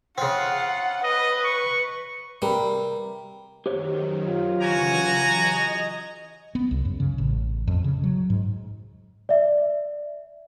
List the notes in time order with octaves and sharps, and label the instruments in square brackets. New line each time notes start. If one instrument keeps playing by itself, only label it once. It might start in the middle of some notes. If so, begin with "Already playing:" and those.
[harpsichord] C#3 C4 [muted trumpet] F4 [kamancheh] F#5
[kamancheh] B4 [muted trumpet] D#5
[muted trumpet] C#6
[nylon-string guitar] C3 A#4 B4 [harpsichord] G3
[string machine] F#2 D#3 [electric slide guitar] G4 C5 C#5
[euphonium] F4
[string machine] C#3 E3 F#3 [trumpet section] F#4 G#5 A#5
[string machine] D#5
[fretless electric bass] B3
C2
F#2
C#3
A1
F2
C#3
F#3
G#2
[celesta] D5 E5